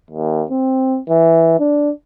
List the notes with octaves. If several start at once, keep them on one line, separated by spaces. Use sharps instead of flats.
D#2
C4
E3
D4